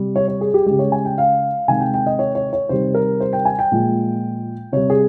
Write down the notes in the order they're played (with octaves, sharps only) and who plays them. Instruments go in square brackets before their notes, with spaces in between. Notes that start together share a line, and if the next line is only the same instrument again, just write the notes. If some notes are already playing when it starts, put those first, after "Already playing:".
Already playing: [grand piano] C3 G3
C#5
C#5
G#4
G4
C#3 G#3 G4
C#5
G#5
G5
F5
C3 D#3 G#3 G#5
G5
G5
D#5
C#5
C#5
C#5
C3 D#3 G3 C5
A#4
C5
G5
G#5
G5
A#2 F3 G#3
C3 G3 C#5
G#4